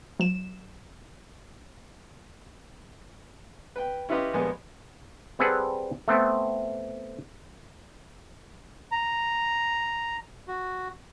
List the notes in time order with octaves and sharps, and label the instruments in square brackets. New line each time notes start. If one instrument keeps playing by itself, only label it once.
[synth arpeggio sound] F#3 E7
[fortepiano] B4 G5
C#4 E4 F4 G4 B4 D#5
A#1 G3 G#3 A#3 B3 G#5
[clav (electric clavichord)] G3 C4 G#4 A4 B4 F#5
A3 B3 C4
[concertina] A#5
F#4